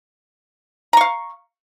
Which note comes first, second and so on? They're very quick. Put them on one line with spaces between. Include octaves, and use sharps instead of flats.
A#5 C#6 F5